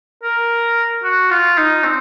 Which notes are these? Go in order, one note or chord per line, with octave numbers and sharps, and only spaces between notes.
A#4
F#4
F4
D#4
C4